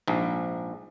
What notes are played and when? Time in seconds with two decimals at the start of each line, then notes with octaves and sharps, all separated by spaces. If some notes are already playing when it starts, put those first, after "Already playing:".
0.08 A#1 G#2